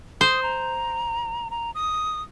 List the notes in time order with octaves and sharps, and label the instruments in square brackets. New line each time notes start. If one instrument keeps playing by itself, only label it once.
[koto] C5 [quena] D#6
[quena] A#5
A#5
D#6